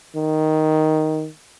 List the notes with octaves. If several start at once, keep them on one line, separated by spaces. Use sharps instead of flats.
D#3